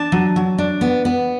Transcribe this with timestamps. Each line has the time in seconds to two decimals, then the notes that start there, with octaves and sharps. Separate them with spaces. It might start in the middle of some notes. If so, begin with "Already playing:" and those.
Already playing: D4 A5
0.12 F#3
0.36 F#3
0.58 D4
0.81 B3
1.05 B3